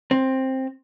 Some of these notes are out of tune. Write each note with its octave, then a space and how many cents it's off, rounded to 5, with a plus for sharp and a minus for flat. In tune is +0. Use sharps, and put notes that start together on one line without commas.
C4 +10